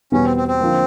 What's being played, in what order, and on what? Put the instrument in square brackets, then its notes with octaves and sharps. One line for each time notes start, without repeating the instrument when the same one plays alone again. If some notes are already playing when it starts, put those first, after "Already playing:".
[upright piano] E2 B2 G3 B3 [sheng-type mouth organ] C#4
[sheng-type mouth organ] C4
C4
C4
[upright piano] D3 F3 A#3